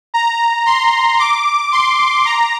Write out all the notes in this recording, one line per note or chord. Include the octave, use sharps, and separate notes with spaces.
A#5
C6
D6
C6
A#5